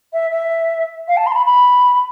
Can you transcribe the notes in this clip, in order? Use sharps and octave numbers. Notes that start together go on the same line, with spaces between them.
E5
E5
F5
A5
C6
A5
B5
B5